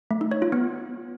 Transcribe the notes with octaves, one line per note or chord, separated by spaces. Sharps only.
A3
D#4
C#5
F4
B3